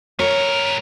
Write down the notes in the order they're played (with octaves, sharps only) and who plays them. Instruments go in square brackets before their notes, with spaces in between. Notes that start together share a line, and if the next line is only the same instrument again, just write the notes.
[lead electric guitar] G3 A#4 [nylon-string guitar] C#5